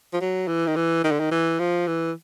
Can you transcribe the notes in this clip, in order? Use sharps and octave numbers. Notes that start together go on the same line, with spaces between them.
F3
F#3
E3
D#3
E3
D#3
D3
D#3
E3
F3
E3